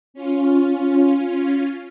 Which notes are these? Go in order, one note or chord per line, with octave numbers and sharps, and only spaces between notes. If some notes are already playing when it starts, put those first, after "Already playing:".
C#4 F4